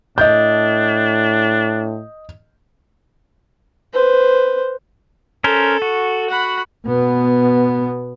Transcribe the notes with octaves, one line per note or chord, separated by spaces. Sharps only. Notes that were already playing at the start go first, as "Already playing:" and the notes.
A2 D4 D#5 G6
B4 C5
C#4 A4 A#4 C5
F#4
F#5 B5
B2 B3